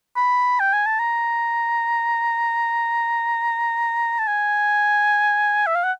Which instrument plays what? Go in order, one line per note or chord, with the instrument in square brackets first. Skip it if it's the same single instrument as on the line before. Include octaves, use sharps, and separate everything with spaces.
[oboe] B5
G5
G#5
A5
A#5
A5
G#5
E5
F5
F#5